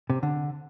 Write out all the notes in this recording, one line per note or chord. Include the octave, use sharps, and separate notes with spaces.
C3
D3